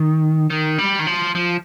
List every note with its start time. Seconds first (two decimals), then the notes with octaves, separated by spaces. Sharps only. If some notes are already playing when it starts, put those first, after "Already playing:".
Already playing: D#3
0.50 D#3
0.78 G3
0.99 D#3
1.07 F3
1.35 F3